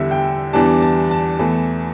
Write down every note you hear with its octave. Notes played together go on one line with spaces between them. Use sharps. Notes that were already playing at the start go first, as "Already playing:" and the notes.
Already playing: E2 D3 G3 E5
G5
E2 E3 G3 D4 A5
A5
A5
E2 E3 A3